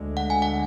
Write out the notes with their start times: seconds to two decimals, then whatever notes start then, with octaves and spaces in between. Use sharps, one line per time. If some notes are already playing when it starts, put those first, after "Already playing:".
Already playing: D2 D3 G#3
0.17 F#5
0.30 G#5
0.42 F#5